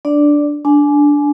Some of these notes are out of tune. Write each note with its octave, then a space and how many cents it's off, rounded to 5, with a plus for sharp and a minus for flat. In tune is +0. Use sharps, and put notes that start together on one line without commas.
D4 +0 D5 -5
D4 -5 G#5 +25